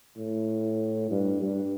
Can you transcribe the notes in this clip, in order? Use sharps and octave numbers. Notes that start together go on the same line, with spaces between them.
A2
G2
G2